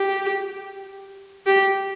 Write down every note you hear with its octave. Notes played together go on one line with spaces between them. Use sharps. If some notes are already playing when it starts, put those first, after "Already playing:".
Already playing: G4
G4